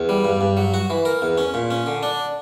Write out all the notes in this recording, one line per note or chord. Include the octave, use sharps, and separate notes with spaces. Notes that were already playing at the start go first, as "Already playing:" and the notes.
Already playing: E2
G3
G2
G2
F#3
F#4
E3
A#4
E2
C#4
A#2
C#4
D3
D4